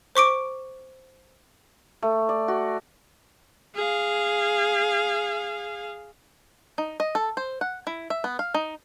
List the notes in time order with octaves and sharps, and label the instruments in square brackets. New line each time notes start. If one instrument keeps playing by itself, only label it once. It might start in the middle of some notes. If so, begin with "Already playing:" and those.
[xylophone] C5 C#6 D6 D7
[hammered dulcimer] A3
D5
F#4
[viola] G#4 F5
[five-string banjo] D#4
D#5
A4
C5
F#5
E4
E5
B3
F5
D#4